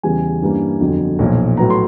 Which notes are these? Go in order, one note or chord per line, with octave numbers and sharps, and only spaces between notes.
E2 C#3 E3 G3 G#5
G2 E3 G3 A#3 C#4
G1 F2 D3 F#3
B1 A#2 F3
A2 F#3 B3 A#5
C6